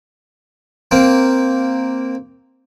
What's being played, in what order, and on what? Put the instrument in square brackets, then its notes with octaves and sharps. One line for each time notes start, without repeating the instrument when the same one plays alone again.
[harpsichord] A#3 C4